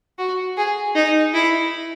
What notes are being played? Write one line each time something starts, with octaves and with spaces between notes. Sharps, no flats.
F#4
G#4
D#4
E4